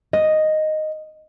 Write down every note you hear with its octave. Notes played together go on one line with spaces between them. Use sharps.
D#5